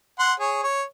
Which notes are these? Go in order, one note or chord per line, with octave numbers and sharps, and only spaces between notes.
F#5 C6
G#4 C#5
C#5